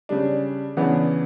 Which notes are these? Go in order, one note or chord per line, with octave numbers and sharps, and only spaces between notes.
C#3 G3 D4
C#3 E3 B3 D4